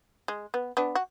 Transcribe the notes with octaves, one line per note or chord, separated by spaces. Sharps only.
G#3
B3
B3 D4
F#4